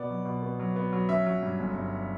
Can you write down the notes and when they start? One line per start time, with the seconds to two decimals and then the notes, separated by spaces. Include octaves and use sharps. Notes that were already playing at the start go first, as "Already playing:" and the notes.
Already playing: B2 B3 D5
0.10 F#3
0.25 B2
0.43 B3
0.60 F#3
0.76 B3
0.93 F#3
1.09 C#4 E5
1.26 F#3
1.43 G2
1.59 G1
1.75 G2